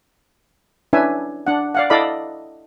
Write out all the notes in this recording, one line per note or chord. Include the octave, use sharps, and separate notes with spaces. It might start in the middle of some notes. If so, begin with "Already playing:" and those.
C#4 D4 E4 B4 E5 G#5
D4 F#5
D5 F5 F#5
E4 A4 D5 D#5 F5 B5